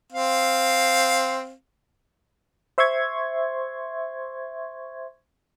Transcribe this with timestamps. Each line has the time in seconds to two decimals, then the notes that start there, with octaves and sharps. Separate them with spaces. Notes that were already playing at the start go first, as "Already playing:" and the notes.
0.12 C4 F5
2.78 C5 E5 C6 C#6 G#6